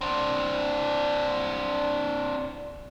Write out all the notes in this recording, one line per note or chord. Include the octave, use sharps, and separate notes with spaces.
C4 D4